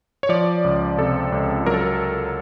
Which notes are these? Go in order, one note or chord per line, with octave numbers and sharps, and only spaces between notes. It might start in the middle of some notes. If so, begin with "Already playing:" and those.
C#5
F3 D5
C#2
C3 A4
C#2
F#3 A#4
A4
A#4